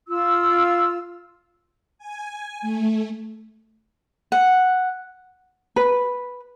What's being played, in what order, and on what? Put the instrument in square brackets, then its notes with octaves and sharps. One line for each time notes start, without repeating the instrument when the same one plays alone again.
[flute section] F4 E6
[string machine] G#5
A3
[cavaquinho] F#5
[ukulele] B4